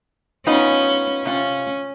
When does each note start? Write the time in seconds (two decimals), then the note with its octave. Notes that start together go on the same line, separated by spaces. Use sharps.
0.47 B3 C#4 D#4 F4
1.25 C3 C#4 F4